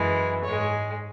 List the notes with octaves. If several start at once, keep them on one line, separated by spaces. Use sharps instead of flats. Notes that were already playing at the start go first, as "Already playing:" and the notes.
Already playing: F#2 E3 G#3
G#2 G#3 C#5